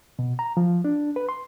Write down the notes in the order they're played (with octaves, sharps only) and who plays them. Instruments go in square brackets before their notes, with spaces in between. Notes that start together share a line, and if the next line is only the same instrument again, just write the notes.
[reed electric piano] B2
A#5
F3
D4
B4
C6